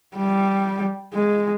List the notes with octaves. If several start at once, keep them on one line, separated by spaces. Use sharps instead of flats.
G3
G#3